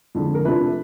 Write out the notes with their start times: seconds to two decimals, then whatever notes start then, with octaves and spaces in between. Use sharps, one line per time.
0.15 F2 D3 F3 G#3
0.35 A#4
0.45 C3 F3 A3 D4 F4 B4